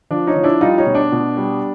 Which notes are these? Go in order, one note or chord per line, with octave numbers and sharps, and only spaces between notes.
F3 D4
C#4 D#4
F3
D4 E4
G3 D#4 F4
C#4 D#4
B2
D4
B2
G3